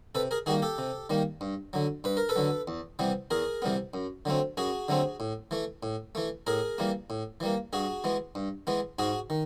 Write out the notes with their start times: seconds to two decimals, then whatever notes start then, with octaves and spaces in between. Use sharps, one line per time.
0.15 C3 A4 B4
0.31 G#4 A#4
0.46 D#3 G3 A#3 F#4 G#4
0.62 G4 A4
0.78 C3
1.10 D#3 G3 A#3
1.41 G2
1.73 D3 F#3
2.04 G2 B4
2.17 A#4
2.29 A4 B4
2.36 D3 F#3
2.68 E2
2.99 C3 E3 G3 B3
3.31 E2 G#4 A#4
3.62 C3 E3 G3 B3
3.94 F#2
4.25 D3 F#3 A3 C4
4.57 F#2 F#4 G#4
4.88 D3 F#3 A3 C4
5.20 A2
5.51 E3 A3
5.83 A2
6.15 E3 A3
6.47 A2 G#4 A#4
6.78 E3 G3 A#3
7.10 A2
7.40 E3 G3 A#3
7.73 G2 F#4 G#4
8.04 E3 G#3 B3
8.35 G2
8.67 E3 G#3 B3
8.99 G#2 F#4 G#4
9.30 D#3